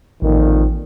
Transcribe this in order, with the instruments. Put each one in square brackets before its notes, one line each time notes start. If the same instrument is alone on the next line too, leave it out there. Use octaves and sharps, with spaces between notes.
[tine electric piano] A1 [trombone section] F2 A#2 D#3